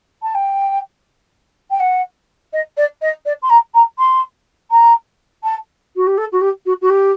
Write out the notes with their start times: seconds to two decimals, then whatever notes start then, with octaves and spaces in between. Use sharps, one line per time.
0.23 A5
0.35 G5
1.71 G5
1.80 F#5
2.53 D#5
2.77 D5
3.02 D#5
3.26 D5
3.42 C6
3.50 A#5
3.74 A#5
3.99 C6
4.71 A#5
5.44 A5
5.96 F#4
6.07 G4
6.18 A4
6.32 F#4
6.41 G4
6.66 F#4
6.81 F#4
6.90 G4